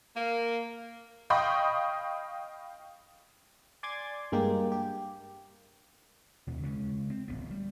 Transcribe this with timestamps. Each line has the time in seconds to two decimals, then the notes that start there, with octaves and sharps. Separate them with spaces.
0.16 A#3
1.30 D#5 F5 G5 B5 C#6 D#6
3.83 D5 G#5 C6 D6 G#6 A6
4.32 G2 G#3 A#3 G4
4.72 G4
6.47 D#2 B2
6.62 C#3 G#3 A3 C#4
7.10 C4
7.28 D1 A1 B3
7.51 G3